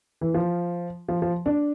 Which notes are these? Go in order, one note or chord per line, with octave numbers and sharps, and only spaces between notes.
E3
F3
F3
F3
D4